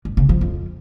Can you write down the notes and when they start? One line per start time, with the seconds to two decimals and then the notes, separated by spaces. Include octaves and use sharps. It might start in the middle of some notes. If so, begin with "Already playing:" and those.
0.05 G2
0.17 C#3
0.29 F3
0.41 F2